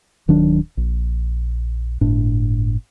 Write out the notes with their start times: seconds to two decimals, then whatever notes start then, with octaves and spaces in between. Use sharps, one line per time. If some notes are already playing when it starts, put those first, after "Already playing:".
0.28 D1 D#3 F#3 D4
0.77 A#1
2.01 G1 A2 D4